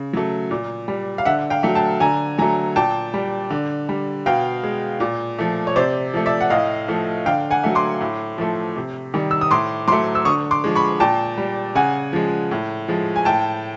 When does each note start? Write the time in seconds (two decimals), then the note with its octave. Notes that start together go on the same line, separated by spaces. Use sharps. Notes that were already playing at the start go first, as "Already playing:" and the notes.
Already playing: C#3
0.13 F#3 A3
0.51 A#2
0.88 G3
1.18 F5
1.25 D3 E5 F#5
1.50 F5 G5
1.63 F#3 A3
1.75 G5 A5
2.00 D3 G#5 A#5
2.38 F#3 A3 G#5 A#5
2.76 A#2 G5 A5
3.14 G3
3.50 D3
3.89 G3
4.26 B2 F5 G5
4.63 G#3
5.00 A#2
5.39 F3 A3
5.67 C#5
5.76 C3 C5 D5
6.14 F3 A3
6.26 D5 E5
6.41 F#5
6.50 A2 D#5 F5
6.88 F3 A3
7.26 D3 F5 G5
7.51 F#5 G#5
7.64 F#3 A3
7.75 C6 D6
8.01 A2
8.38 F3 A3
8.76 C3
9.14 D#3 G3
9.31 E6
9.41 D#6
9.51 A2 C6 D6
9.88 F#3 A3 C6 D6
10.15 E6
10.25 D3 C#6 D#6
10.51 C6 D6
10.64 F3 G#3
10.75 B5 C#6
11.00 A#2 G5 A5
11.38 G3
11.75 C#3 F#5 G#5
12.13 F3 G#3
12.51 A2
12.88 F3 G#3
13.16 G#5
13.25 A2 G5 A5